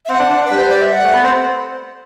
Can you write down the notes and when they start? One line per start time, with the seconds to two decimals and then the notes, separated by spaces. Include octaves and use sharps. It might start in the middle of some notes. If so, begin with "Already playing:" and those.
0.05 E5
0.09 C4 F#5
0.20 D4
0.30 D4
0.41 D4
0.45 B4
0.51 G3
0.58 C5
0.70 D5
0.81 E5
0.92 F#5
1.03 A3
1.14 B3
1.24 C4